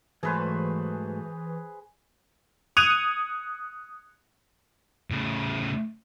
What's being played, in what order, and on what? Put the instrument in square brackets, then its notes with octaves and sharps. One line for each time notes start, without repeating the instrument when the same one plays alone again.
[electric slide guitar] G#2 F#3 A3 [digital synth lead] E3 [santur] G#4 B4 C5
[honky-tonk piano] D#6 F#6 G#6 C#7 D#7 F7
[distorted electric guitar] A2 C#3